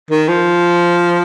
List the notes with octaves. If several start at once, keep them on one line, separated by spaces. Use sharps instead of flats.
D#3
F3